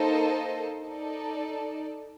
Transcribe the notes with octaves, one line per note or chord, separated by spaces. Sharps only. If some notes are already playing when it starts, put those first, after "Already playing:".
Already playing: A#3 D#4 A4 C5 D#5
D#4 A4 D5